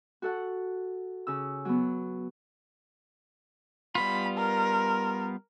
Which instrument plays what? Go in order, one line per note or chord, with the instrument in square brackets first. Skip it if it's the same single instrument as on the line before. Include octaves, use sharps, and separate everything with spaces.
[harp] F#4 A4 F#5
C#3 E6
F#3 B3
[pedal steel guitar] G3 B3 F4 [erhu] B5
[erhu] A#4